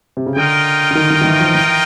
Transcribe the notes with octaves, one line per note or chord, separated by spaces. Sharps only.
C3
C#3
D3 F4 A#4 D#5 G5
D3
D#3
D#3
D#3
E3
F3
E3